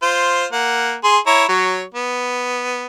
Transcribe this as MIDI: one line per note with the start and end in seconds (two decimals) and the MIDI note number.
0.03 0.46 65
0.03 0.46 72
0.52 0.95 58
0.52 0.95 78
1.04 1.18 68
1.04 1.18 84
1.27 1.44 64
1.27 1.44 73
1.27 1.44 82
1.49 1.83 54
1.49 1.83 73
1.95 2.87 59